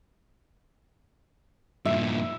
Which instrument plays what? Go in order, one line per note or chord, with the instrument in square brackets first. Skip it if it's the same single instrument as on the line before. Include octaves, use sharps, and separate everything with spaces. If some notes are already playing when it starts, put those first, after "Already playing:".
[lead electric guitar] G2 A#2 [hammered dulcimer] E5